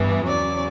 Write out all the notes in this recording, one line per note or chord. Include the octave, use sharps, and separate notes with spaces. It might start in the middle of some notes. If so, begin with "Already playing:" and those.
Already playing: G2 E3 B3
E2 C#3 F#3 C#4 D5